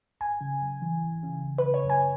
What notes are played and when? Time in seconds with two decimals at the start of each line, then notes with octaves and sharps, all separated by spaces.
0.20 G#1 G#5
0.41 C#3
0.62 F#2
0.82 E3
1.02 G#1
1.23 C#3
1.43 G#1
1.58 B4
1.64 C#3
1.74 C#5
1.84 F#2
1.90 G#5